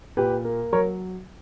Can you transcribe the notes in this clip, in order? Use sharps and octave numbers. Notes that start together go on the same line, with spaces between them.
A#2 G4 B4
A#3
F#3 A#4 C#5